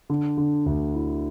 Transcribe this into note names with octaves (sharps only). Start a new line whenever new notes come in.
D3
D3
D2
E4